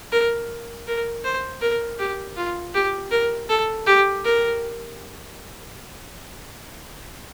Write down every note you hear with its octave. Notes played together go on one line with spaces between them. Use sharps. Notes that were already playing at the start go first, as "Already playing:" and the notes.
A#4
A#4
C5
A#4
G4
F4
G4
A#4
A4
G4
A#4